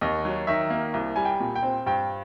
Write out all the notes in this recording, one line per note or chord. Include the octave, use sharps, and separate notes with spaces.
D#2 D#5
F#3
D#3 E5
A#3
C2
G3 G#5
G5
A#2
G5
C4
G2 G5